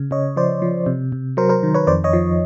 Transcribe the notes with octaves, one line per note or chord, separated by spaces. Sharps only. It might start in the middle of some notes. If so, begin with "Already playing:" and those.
Already playing: C#3
C#3 C#5 D#5
F3 C5 D5
F3
C3
C3
F#3 A#4 C5
A#4 C5
D#3
B4 C#5
F2 C5 D5
C#5 D#5
F3